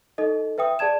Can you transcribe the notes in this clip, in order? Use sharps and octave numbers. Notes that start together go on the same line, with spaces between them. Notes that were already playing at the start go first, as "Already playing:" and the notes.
D#4 A4 D#5
B4 E5 G5 D#6
G#4 D5 A5 G#6 E7